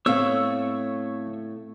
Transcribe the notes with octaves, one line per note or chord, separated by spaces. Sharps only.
A2 A3 B3 C4 C#5 F5 E6